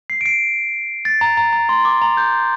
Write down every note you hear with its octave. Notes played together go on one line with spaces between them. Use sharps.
C7
D7
C7
A6
A#5
A#5
A#5
C6
D6
A#5
G6